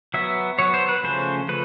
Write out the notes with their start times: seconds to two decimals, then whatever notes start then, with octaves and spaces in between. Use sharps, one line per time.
0.14 F#3 B3 E5
0.59 F#3 B3 C#5
0.74 C5
0.89 B4
1.03 C#3 F3 A3 C#4 C5
1.48 C#3 F3 A3 B4